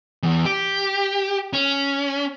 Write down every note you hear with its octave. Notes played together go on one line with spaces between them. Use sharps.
E2
G4
C#4